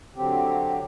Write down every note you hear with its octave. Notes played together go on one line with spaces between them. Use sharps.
D3 F#3 C4 G4